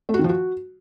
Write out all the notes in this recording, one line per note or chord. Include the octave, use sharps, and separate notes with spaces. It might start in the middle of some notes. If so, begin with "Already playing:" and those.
A3
F#4
D#3
F3
F#4